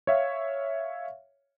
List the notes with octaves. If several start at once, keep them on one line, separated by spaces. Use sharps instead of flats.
C#5 E5 F5